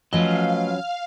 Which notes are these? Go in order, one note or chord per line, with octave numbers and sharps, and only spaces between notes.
F3 F#3 A3 C#4 B4 D#5 F5